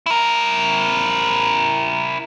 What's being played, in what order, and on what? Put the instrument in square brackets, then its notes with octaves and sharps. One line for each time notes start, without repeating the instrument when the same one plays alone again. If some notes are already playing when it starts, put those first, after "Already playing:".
[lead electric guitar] E4 A#4